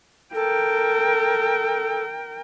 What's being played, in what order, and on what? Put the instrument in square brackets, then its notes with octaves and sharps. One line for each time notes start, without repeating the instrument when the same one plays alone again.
[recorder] A4 [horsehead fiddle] A#4 G5